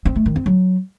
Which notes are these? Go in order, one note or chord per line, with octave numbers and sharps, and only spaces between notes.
C4
A3
D#3
C4
F#3